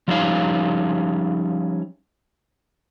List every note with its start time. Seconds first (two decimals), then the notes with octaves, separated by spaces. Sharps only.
0.08 F3 G3 C#4 D#4 F5